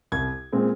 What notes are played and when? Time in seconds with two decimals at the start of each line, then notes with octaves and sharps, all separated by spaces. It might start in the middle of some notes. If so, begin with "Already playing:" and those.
0.12 C2 G#6
0.52 A#2 G#3 C4